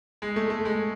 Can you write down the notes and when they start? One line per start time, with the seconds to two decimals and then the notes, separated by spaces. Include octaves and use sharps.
0.22 G#3
0.36 A3
0.50 A3
0.65 G#3